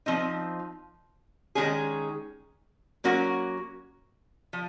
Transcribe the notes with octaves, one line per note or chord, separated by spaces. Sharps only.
F3 C4 D#4
D#3 G#3 C#4 G#4
F#3 A#3 C#4 F#4 A#4
F3